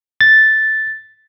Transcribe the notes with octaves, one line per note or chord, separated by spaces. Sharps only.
A6